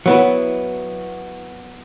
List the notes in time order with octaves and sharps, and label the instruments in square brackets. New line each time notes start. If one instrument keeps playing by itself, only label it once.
[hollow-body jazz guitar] F#3 B3 E4